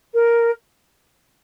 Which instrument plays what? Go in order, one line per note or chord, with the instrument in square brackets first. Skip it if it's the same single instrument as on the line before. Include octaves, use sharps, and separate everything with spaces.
[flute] A#4